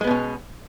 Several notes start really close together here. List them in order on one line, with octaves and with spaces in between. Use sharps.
G#3 B3 B2 C#4